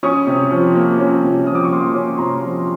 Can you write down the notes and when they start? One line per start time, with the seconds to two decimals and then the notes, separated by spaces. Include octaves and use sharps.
0.03 C#4 C#6 D#6
0.27 C3
0.51 F3
0.75 A#3
0.99 C#4
1.23 C3
1.46 F3 D#6
1.55 D6
1.64 C#6
1.71 A#3 C6 D6
1.94 C#4
2.17 C3 A#5 C6
2.42 F3